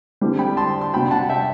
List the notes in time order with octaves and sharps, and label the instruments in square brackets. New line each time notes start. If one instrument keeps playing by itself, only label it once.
[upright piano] D3 G3 C4 E4 G4
[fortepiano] G5 B5
A5 C6
C6
[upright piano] C3 G3 D4 F#4 [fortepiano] G5 B5
[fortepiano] F#5 A5
E5 G5